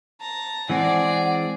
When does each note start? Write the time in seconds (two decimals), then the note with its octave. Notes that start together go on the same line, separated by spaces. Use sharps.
0.21 A5 A#5
0.69 E3 G#3 C4 G#4 D5 F#5